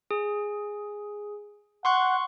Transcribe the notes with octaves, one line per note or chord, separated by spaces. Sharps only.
G#4
F#5 C6 C#6 F#6